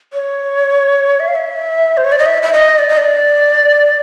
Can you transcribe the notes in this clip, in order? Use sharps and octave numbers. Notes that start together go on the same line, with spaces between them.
C#5
E5
F5
E5
C5
C#5
D5
D#5
E5
E5
D#5
D5
D#5
D5